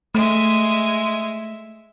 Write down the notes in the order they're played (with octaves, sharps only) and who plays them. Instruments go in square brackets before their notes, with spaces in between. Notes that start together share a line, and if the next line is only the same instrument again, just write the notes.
[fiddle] G#3 E5 [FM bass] A3